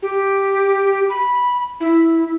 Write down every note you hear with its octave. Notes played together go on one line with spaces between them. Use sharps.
G4
B5
E4